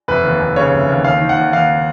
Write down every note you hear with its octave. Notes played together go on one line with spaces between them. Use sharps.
F1 B4
D#2
F1
C#3 C#5
F1
D#2
D#2 F5
D#3
F#5
D#2
D#2 F5